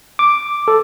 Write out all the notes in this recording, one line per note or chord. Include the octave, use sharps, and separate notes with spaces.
D6
A4